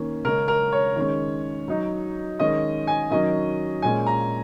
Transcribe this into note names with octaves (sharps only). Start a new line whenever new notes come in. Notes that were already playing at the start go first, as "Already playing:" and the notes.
Already playing: D#3 A#3 C#4
C#3 G#3 C#4 A#4
A#4
C#5
D#3 G#3 C#4
F#3 D#4
D#3 G#3 C#4 D#5
G#5
D#3 F#3 C#4 D#5
A#2 G#3 C#4 G#5
A#5